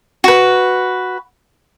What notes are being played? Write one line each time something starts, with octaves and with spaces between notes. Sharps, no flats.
F#4 B4